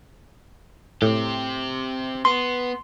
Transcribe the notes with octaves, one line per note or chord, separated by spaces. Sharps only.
A2 C4 G4
B3 C6